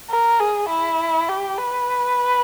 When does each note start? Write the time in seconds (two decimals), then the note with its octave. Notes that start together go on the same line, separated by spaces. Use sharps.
0.10 A#4
0.40 G#4
0.69 E4
1.29 G4
1.58 B4